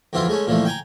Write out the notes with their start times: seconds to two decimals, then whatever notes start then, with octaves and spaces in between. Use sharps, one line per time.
0.13 F2 B2 E3 F3 E4 F4
0.28 G#3 A3 C#4
0.47 A#2 E3 F3 A3
0.65 G5 G#5 A#5